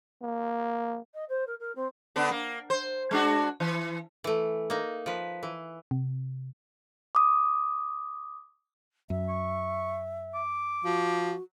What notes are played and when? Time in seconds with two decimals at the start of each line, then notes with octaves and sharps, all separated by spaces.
0.22 A#3
1.14 D#5
1.29 C5
1.47 A#4
1.60 A#4
1.76 C4
2.16 D3 B3 D4
2.31 A#3
2.70 C5
3.11 G#3 D4 F#4
3.60 E3
4.24 E3 A3
4.70 A#3 D#4
5.06 F3 B4
5.43 E3
5.91 C3
7.15 D6 D#6
9.10 F#2 E5
9.29 C#6
10.34 D6
10.84 F3 F#4